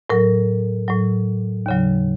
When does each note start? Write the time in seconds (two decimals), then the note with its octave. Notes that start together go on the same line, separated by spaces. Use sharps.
0.10 A2 F#3 A#4
0.88 A2 F#3
1.66 D#2 C#3 F#3